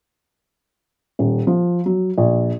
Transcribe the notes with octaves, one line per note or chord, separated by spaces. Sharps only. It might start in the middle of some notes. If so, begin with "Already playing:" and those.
D#1
F3
F#3
A#1